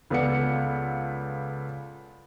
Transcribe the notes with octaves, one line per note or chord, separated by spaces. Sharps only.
C#2 B3 A4 D5 F#5 C#7